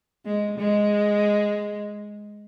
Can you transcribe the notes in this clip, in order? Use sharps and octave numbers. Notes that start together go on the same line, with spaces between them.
G#3
G#3